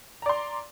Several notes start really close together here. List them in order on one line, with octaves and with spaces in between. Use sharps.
A#5 D5 C6